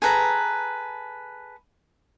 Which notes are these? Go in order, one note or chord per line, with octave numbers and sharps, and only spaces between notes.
G#4 A4 B4 A#5